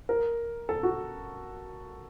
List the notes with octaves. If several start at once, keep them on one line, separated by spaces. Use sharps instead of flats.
A#4
A4
F#4